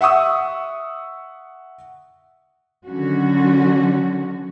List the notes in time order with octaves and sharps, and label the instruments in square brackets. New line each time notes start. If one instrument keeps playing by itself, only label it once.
[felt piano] E5 F#5 C#6 D#6 E6
[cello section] D3 D#3 F#3 C#4 F#4